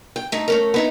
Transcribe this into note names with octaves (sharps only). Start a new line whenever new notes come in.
G5
A3 D#4
A3 C#4 A#4
B3 D#4 E4